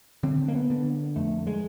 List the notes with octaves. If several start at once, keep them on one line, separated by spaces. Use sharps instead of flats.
D3 C4
A#3
B3
D3
F2 A3
G#3